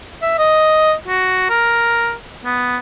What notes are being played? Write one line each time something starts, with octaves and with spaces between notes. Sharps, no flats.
E5
D#5
F#4
A#4
B3